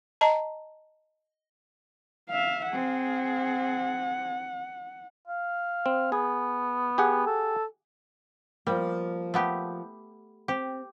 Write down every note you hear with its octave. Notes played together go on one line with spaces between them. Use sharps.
D#5 A5 A#5
E5 F5
C4 G#4 F#5
F5
C4
B3 G#4
G4 G#4 F#5
A4
F3 G3 A#3
A3 B3 G4
C4 G4